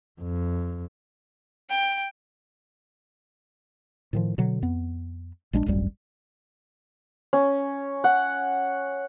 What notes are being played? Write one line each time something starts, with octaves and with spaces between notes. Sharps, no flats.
F2
G5
A2 D#3 F3
B2 D3 F#3
F2 B3
A#1 G#3 C#4 D4
D1 G#1 F#2 G3
C#4
F#5